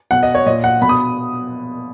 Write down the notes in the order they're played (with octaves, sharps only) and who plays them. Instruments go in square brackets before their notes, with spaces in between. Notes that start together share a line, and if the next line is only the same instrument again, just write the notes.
[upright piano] B2 F#5
D#5
C#5
A#2 D#5
F#5
B2 B5
D#6